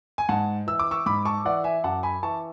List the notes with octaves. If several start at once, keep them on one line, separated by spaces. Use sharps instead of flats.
G#5
G#2 F#5 A5
E3 E6
D6
C#6 E6
G#2 B5 D6
A5 C#6
E3 D5 F#5
E5 G#5
F#2 F#5 A5
G#5 B5
E3 A5 C#6